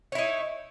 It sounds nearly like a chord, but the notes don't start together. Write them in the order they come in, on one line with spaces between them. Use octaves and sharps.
C#5 E4 D#4